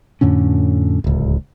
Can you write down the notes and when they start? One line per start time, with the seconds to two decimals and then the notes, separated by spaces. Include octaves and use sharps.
0.21 F2 A2 D3 C#4
1.04 D1 C#2